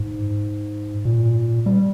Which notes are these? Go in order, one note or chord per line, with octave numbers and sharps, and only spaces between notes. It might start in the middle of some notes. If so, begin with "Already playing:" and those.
Already playing: G#2
A#2
G3